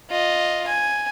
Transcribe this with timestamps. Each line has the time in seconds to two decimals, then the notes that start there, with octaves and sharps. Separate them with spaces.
0.10 F4 D#5
0.67 G#5